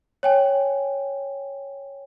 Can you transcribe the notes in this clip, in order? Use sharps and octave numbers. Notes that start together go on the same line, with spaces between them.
C#5 G5 G#5